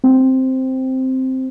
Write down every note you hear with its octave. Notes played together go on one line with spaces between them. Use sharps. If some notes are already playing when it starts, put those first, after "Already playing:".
C4